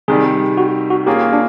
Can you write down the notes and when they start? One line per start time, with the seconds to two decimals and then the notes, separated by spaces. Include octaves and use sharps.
0.08 C3 D#3 G3 G#4
0.57 F#4
0.90 F#4
1.06 A#3 C#4 F4 G4 G#4
1.33 D4